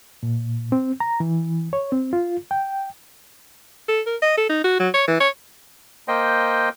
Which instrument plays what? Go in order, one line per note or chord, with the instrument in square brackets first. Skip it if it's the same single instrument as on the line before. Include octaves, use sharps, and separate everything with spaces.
[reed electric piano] A#2
C4
A#5
E3
C#5
C4
F4
G5
[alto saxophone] A4
A#4
D#5
A4
D#4
F#4
F#3
C#5
E3
C#5
[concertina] A#3 C5 D#5 G5